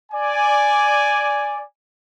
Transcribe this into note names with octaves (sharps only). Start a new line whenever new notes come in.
D5 G#5